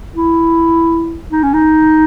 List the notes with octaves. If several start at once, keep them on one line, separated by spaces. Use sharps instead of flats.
E4
D#4
C#4
D#4